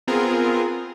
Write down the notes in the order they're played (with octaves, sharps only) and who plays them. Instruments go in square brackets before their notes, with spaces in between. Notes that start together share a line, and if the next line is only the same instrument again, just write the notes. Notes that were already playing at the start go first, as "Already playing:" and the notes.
[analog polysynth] B3 C4 F4 G#4 A#4